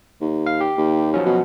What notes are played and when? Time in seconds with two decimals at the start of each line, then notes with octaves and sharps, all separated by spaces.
0.21 D#2
0.46 F5
0.61 G4
0.78 D#2
1.14 F3 F#3 C#4
1.26 B2